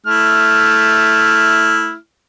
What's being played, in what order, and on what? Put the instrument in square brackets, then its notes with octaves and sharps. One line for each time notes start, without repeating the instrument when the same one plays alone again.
[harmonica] A3 E4 F6